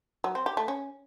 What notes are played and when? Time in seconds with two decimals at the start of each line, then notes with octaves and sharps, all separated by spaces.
0.24 F#3
0.35 C4
0.46 G4
0.57 A3
0.68 C#4